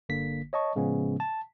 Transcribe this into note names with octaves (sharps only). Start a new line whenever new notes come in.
G1 D3 A#3 B6
C#5 D#5 A5 C#6
A2 C#3 F3 G#3 B3 C#4
A5